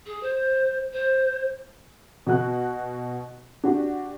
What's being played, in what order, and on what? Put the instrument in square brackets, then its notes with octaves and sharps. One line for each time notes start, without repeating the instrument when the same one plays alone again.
[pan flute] G#4
C5
C5
[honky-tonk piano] B2 F#4 F#6
D4 F#4 G4